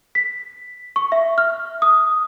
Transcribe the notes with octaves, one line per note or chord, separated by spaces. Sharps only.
B6
C#6
E5
F6
D#6